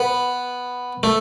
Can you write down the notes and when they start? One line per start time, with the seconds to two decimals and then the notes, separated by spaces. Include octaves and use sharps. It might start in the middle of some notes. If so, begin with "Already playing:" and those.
Already playing: B3
1.03 A3